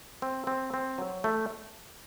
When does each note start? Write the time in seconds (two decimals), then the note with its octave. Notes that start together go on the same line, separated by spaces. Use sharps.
0.22 C4
0.47 C4
0.74 C4
0.98 F#3
1.24 A3